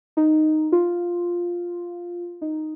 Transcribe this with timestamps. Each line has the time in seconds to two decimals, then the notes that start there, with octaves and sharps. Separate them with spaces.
0.17 D#4
0.72 F4
2.42 D#4